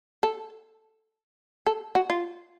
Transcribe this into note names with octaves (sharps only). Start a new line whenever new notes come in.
A4
A4
F#4
F4